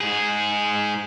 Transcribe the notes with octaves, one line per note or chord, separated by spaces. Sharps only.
G#2 G#4